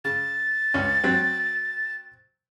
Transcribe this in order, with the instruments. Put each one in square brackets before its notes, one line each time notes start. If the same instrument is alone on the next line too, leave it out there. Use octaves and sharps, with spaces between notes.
[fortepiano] C#3 [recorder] A6
[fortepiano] C#2 C#4
F#3 C4